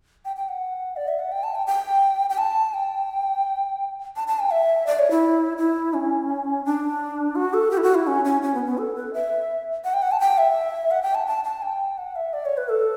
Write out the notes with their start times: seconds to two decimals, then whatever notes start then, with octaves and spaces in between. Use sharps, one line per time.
0.25 G5
0.36 G5
0.49 F#5
0.96 D5
1.08 E5
1.19 F#5
1.32 G5
1.43 A5
1.55 G5
1.67 G5
2.30 G5
2.38 A5
2.74 G5
4.16 A5
4.28 A5
4.40 G5
4.51 E5
4.87 D5
4.99 C#5
5.11 E4
5.58 E4
5.94 C#4
6.65 D4
7.35 F#4
7.54 A4
7.71 G4
7.78 E4
7.83 F#4
7.95 E4
8.07 C#4
8.25 C#4
8.42 C#4
8.54 B3
8.66 B3
8.78 A4
8.96 B4
9.14 E5
9.84 F#5
9.94 G5
10.02 F#5
10.11 A5
10.20 G5
10.38 E5
10.91 F#5
11.03 G5
11.15 A5
11.27 A5
11.44 A5
11.62 G5
11.98 F#5
12.16 E5
12.33 D5
12.45 C#5
12.57 B4
12.69 A4